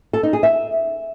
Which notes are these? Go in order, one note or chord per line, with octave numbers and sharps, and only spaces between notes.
A4
D#4
G#4
E5